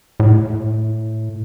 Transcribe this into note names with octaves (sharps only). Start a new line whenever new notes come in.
A2